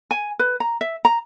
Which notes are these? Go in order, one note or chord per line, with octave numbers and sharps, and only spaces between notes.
G#5
B4
A#5
E5
A#5